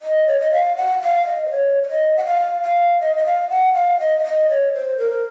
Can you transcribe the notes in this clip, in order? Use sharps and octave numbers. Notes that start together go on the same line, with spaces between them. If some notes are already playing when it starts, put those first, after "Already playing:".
D#5
C#5
D#5
F5
F#5
F5
D#5
C5
C#5
C#5
D#5
F#5
F5
F5
D#5
D#5
F5
F#5
F5
D#5
F5
D#5
C#5
C5
A#4